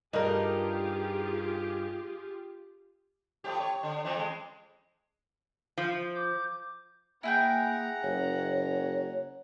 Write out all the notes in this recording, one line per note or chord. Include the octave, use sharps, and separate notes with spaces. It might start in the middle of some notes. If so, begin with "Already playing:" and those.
G2 D#4 F4 G4 G#4 A#4
A2 F3 G4
C#5
D3
F2 E3 F3
G#3
F3
D6 G6
A#3 E4 G#4 F#5 G5 A#5
F#1 C#5